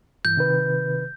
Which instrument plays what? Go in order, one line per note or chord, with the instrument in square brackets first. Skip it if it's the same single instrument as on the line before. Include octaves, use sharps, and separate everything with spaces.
[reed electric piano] G2 E3 [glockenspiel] G6
[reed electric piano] C3 D#3 B4